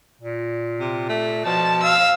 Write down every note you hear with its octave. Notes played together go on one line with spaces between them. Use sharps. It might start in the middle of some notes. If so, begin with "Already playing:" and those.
A#2
C3
A3
B2 F3 A5
F5 E6